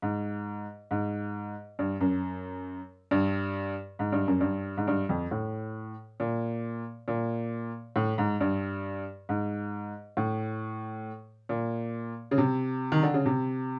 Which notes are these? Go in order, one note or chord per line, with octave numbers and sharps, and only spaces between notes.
G#2
G#2
G2
F#2
G2
G#2
G2
F#2
G2
G#2
G2
F2
A2
A#2
A#2
A2
G#2
G2
G#2
A2
A#2
C#3
C3
D#3
D3
C#3
C3